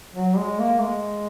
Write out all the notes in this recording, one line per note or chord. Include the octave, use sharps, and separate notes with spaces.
F#3
G#3
A#3
G#3